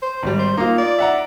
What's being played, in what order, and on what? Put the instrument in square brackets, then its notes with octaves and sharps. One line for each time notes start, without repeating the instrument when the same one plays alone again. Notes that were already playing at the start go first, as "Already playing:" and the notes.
[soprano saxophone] C5
[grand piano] G#1 G3
[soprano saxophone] C5
[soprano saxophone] A#3 [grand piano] D#4 F4
[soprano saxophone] D5
[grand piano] E5 F#5 A#5